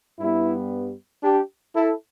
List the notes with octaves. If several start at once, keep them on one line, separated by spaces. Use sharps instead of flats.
G2 G3 B3 E4
D4 G4
E4 A4